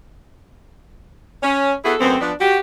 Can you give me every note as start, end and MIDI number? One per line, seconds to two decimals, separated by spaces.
1.43 1.73 61
1.85 1.95 59
1.85 1.95 64
1.85 1.95 66
1.85 1.95 68
1.85 1.95 69
2.01 2.17 42
2.01 2.17 57
2.01 2.17 59
2.01 2.17 60
2.21 2.33 53
2.21 2.33 59
2.21 2.33 62
2.40 2.59 66
2.40 2.59 67